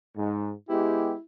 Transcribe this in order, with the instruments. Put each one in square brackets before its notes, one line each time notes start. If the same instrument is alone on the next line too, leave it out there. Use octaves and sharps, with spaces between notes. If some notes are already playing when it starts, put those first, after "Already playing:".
[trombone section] G#2
[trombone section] G#3 B3 G4 [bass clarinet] E4